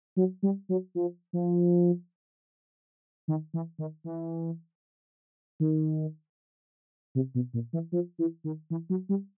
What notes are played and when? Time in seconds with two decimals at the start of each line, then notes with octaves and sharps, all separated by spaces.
0.16 F#3
0.43 G3
0.69 F#3
0.95 F3
1.33 F3
3.28 D#3
3.54 E3
3.79 D#3
4.04 E3
5.60 D#3
7.15 C3
7.35 B2
7.54 A#2
7.73 E3
7.92 F3
8.18 E3
8.44 D#3
8.70 E3
8.90 F#3
9.09 G3